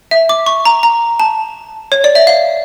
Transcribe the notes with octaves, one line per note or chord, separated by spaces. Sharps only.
E5
D6
C#6
A#5
A#5
A5
C#5
D5
E5
F5